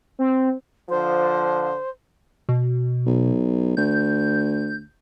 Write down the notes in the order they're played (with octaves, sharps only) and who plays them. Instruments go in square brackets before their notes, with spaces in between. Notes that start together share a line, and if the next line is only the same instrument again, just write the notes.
[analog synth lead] C4
[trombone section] D3 F3 [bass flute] C5
[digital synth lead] B2
[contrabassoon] B1
[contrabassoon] D2 [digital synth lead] G6